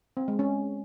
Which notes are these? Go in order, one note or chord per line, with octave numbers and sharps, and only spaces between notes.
C4
G#3
C#4